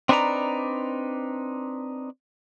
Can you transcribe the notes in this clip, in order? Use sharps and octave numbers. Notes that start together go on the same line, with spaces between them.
C4 D4 D#4 B4 D5 A#5